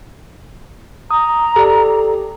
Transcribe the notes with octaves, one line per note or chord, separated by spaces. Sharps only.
A#5 D#6
G4 A4 D5